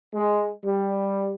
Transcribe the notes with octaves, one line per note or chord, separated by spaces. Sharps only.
G#3
G3